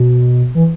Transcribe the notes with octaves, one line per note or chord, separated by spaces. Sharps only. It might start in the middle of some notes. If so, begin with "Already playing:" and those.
Already playing: B2
E3